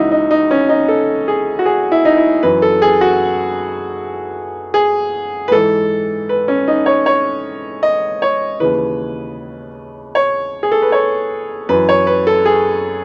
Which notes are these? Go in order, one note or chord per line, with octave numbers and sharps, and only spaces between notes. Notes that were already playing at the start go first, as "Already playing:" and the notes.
Already playing: C#2 C#3 E3 D#4 E4 F#4
D#4
D#4
C#4
D#4
A4
G#4
F#4
G#4
E4
D#4
E4
F#2 E3 B4
A4
G#4
F#4
G#4
B4
G#2 E3 A4
B4
C#4
D#4
C#5
C#5
D#5
C#5
D#2 C#3 E3 B4
C#5
G#4
A4
B4
C#5
F#2 E3 B4
C#5
B4
A4
G#4